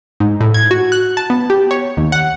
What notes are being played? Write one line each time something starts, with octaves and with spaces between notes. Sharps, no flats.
G#2
A2
G#6
F#4
F#6
A5
B3
G4
C#5
D#2
F#5